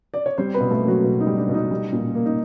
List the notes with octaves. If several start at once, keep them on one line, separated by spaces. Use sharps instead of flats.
D5
C#5
G3 C4 C5
B3 B4
B2
A3 A4
A#3
F#3 F#4
B2
D#4
G3
D4
B2
D#4
G3
A#2
A#3
D#4